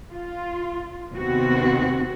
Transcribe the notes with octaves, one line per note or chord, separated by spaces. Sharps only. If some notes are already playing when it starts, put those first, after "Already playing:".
F4
D#2 C3 B3 C4 F#4